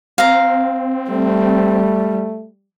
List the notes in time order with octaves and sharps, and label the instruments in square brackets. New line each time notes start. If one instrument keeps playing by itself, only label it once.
[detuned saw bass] C4 [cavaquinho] F5 A#5
[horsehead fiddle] G3 [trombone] A3